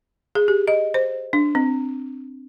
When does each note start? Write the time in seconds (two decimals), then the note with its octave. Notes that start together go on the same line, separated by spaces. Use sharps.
0.35 G#4
0.48 G4
0.68 D#5
0.94 C5
1.33 D4
1.55 C4